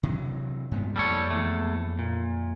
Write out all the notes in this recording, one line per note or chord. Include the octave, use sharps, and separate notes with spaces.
C3 E3 F#3
G2 G#3 B3
F2 G3 A#3 A4 C#5
E2 A3
A#2